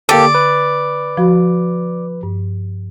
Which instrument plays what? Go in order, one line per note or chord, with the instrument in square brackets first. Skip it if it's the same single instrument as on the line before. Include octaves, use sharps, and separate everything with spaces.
[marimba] D3 [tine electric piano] A#3 G4 A4 [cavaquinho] D5
[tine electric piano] B4
[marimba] F3 F#4 B5
G2